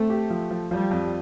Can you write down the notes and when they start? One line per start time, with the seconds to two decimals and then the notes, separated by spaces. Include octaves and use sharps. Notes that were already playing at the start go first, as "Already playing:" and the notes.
Already playing: A3 C4
0.10 G4
0.30 F3
0.51 F3
0.71 F3 G3
0.91 F2